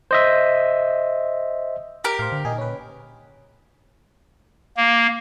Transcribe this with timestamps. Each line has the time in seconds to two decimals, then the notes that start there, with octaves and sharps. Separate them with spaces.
0.11 C5 D#5 E5
2.04 G4 A#4
2.19 A2 C5 F5
2.32 D3
2.45 A#2 D#4 G#4
2.58 C#4 B4
4.77 A#3